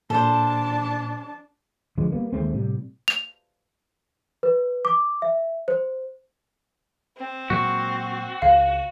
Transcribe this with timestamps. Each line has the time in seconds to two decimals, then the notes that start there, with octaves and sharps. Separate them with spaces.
0.10 A#2 D4 A4 C5 A5
1.98 D3 F3 G#3
2.12 G3 A#3 B3
2.33 D#2 G#3 A3 C4
2.53 A2 C3 G3
3.08 F7
4.43 B4
4.85 D6
5.22 E5
5.68 C5
7.18 C4
7.50 A#2 F#3 G#3 F#4
8.42 C#2 F5